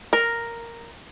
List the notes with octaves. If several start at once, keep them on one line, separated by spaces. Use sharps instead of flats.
A#4